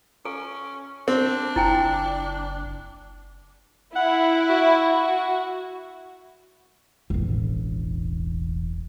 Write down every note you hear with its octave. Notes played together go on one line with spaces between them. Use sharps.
C#4 A4
C4 D4
F#1 E4 G5 G#5
E4 F#5
F#4
E1 A1